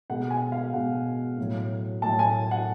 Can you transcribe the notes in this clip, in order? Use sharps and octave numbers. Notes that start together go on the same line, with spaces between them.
B2 G#3 F#5
G#5
F5
B2 G#3 F#5
A2 F#3
A2 F#3 A5
G#5
F#5